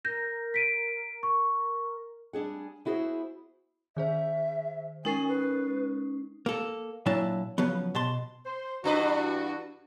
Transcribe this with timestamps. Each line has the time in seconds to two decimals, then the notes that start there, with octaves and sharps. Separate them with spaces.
0.05 A#4 G6 A#6
0.54 B6 D7 D#7
1.23 C#6
2.33 G3 D4 G#4 F#5
2.85 B3 E4 F#4 G#4 B4 C5
3.97 D#3 G#4 C5 E5
5.05 G#3 C#4 D#4 A#4 G#5 C7
5.28 B4
6.46 A#3 A4
7.06 A#2 F#3 D4 E4 A5
7.58 C#3 F3 F#3 B3
7.95 B2 A5 C6
8.45 C5
8.84 G2 E3 D4 E4 F#4 B4